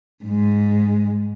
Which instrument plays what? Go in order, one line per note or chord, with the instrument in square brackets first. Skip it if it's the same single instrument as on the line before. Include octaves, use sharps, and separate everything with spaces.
[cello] G#2 G#3